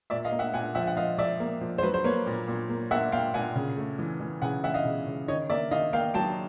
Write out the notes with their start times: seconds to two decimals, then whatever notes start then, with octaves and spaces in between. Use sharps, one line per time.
0.10 A#2 D5 E5
0.25 D#5 F5
0.32 A#3
0.39 E5 F#5
0.54 A#2 F#5 G#5
0.75 F3 E5 F#5
0.87 F#5
0.97 F3 D#5 F5
1.18 F3 D5 E5
1.40 A#3
1.61 F3
1.78 C5
1.83 F#3 B4
1.94 C5
2.04 A#3 B4 C#5
2.27 A#2
2.48 A#2
2.69 A#3
2.91 A#3 E5 F#5
3.12 A#2 F5 G5
3.34 A#2 F#5 G#5
3.56 C#3
3.77 A3
3.99 E3
4.20 E3
4.42 C#3 F#5 G#5
4.63 E3 E5 F#5
4.74 D#5 F5
4.85 C#3
5.07 C#3
5.28 D#3 C#5 D#5
5.50 A#3 D5 E5
5.71 D#3 D#5 F5
5.93 A#3 F5 G5
6.14 F#3 G5 A5